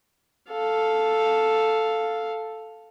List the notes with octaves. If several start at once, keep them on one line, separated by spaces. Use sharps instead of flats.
A4 F5